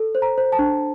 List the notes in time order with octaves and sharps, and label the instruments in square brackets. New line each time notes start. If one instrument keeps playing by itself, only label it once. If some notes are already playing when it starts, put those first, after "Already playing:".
Already playing: [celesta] A4
C5
A#5
C5
A5
D4